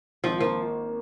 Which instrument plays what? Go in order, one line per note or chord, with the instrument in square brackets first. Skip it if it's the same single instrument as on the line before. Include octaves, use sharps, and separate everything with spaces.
[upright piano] G#1 [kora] F3
[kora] F3 [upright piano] A#3